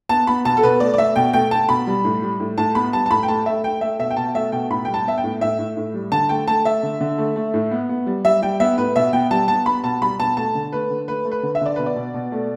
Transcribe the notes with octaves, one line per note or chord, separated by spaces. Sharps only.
B3 A5
B3 B5
B2 A5
A4
B2 B4
A3 D5
D5
A3 E5
B2 G5
A3 G5
A3 A5
B2 B5
G3
A2
G3
A2
A2 A5
B3 B5
G3 A5
A5
A2 B5
G5
A3 A5
A3 E5
A3 G5
A3 E5
B2 E5
G5
B2 A5
A3 E5
B2 G5
A2 B5
G3 G5
A5
B3 E5
G5
A2
A2 E5
A2
A2
G3
D3 A5
A3 G5
A3 A5
A3 E5
D3
D3
A3
A3
A2
B3
B3
G3
G3 E5
G3 G5
B3 E5
A2 B4
B2 E5
B3 G5
G3 A5
B3 A5
B3 B5
B2 A5
G3 B5
B2 A5
A3 A5
D3
A3 B4
D3
A3 B4
A3
B4
D3
E5
D3 D5
B2 B4
D5
B2
B2
A3